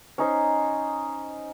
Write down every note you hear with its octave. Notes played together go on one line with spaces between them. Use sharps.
C#4 D#4 C5